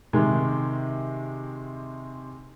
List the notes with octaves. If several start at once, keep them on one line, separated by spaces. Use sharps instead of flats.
C3 D#3 G#3